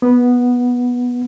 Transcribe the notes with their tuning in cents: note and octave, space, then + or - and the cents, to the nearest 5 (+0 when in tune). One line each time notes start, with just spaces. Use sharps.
B3 -10